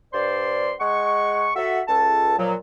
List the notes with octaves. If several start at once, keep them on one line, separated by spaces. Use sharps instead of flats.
G2 C5 D5 C6
G#3 F#5 C#6
F#4 A4 E5
C#2 A4 A5
A#2 F3 F#3